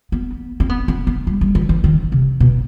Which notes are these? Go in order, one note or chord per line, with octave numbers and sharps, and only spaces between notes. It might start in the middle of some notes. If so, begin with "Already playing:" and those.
B3
C4
B3
C4
B3
G3
G3
E3
E3
D#3
C3
B2